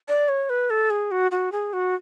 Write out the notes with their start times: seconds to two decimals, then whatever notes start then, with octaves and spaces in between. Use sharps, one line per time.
0.08 D5
0.29 C#5
0.50 B4
0.70 A4
0.90 G#4
1.11 F#4
1.31 F#4
1.52 G#4
1.73 F#4